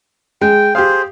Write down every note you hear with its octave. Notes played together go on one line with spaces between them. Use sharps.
G#3 G5
G4 G#4 C5 F5